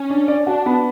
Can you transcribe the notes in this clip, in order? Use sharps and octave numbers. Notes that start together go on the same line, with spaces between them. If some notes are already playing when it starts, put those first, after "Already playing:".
Already playing: C#4
D4
D5
D4 F#4
B3